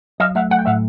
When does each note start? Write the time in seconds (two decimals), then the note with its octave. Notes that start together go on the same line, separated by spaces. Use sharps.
0.20 F#3 D#5 F5
0.35 A3 E5 F#5
0.51 A3 F#5
0.59 G5
0.66 A2 E5 F#5